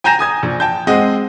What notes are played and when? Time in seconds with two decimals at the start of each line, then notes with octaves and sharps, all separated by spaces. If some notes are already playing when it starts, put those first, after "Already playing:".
0.04 G5 G#5 A#5 G6 A#6 E7
0.19 G#5 D#6 G#6
0.42 A#1
0.60 G5 A5 G6
0.87 G#3 C4 G#4 D#5 F#5